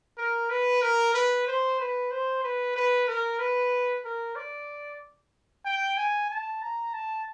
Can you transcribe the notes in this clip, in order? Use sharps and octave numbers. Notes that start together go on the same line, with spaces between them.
A#4
B4
A#4
B4
C5
B4
C5
B4
B4
A#4
B4
A#4
D5
G5
G#5
A5
A#5
A5